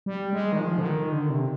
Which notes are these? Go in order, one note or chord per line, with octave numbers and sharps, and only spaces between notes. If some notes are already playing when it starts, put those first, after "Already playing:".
G3
G#3
D#3
F3
D3
D#3
D3
C3